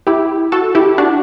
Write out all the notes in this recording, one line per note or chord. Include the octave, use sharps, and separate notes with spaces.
E4 G4
F#4 A4
E4 G4
D4 F#4